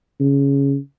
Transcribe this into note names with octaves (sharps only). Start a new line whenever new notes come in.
C#3